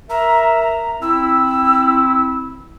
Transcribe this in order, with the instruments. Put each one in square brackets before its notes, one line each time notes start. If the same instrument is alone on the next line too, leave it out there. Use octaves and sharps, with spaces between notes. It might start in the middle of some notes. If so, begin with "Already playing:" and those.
[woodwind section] A#4 E5 [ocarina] A#5
[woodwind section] C4 E4 [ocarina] E6